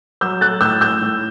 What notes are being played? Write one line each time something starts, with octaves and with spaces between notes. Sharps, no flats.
F#3 E6 G6
A3 F#6 A6
A2 E6 G6
A2 E6 G6
A2